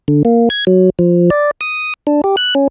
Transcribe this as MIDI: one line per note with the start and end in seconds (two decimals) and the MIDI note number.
0.08 0.23 50
0.25 0.49 58
0.50 0.65 92
0.67 0.90 54
0.99 1.30 53
1.30 1.51 74
1.61 1.94 87
2.07 2.21 62
2.24 2.36 67
2.37 2.54 90
2.55 2.68 61